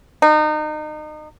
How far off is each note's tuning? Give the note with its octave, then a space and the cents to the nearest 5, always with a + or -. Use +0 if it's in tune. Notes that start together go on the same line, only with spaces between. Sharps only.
D#4 -30